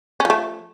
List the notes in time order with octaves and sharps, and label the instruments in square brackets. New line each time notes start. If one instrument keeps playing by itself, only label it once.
[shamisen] C#4
F3
A3